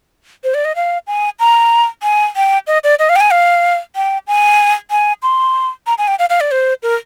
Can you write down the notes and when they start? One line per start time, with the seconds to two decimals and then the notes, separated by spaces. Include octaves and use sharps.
0.44 C5
0.54 D5
0.65 D#5
0.76 F5
1.07 G#5
1.39 A#5
2.03 G#5
2.36 G5
2.67 D#5
2.84 D5
2.99 D#5
3.09 F5
3.16 G5
3.20 G#5
3.31 F5
3.96 G5
4.27 G#5
4.90 G#5
5.23 C6
5.87 A#5
5.98 G#5
6.08 G5
6.19 F5
6.30 F5
6.40 D5
6.51 C5
6.83 A#4